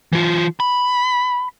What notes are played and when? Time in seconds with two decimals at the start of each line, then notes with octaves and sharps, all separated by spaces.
0.13 E3 F4
0.60 B5